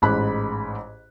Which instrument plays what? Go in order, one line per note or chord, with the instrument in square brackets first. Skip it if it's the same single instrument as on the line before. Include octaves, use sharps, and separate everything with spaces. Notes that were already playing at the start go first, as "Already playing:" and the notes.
[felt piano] A1 G#2 B5 F#6